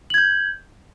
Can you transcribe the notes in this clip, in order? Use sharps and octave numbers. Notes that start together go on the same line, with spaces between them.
G6 G#6 F#7